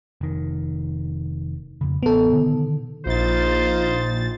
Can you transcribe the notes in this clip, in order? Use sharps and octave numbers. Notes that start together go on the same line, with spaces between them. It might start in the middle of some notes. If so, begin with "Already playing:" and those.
F1 D#3
F2 C#3
A1 B3 A4
B2 D3 D#3
A#1 D#4 F4 C5 A6